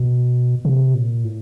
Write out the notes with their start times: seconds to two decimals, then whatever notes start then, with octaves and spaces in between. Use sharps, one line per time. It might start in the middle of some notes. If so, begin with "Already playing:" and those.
Already playing: B2
0.65 C3
0.94 A#2
1.24 A2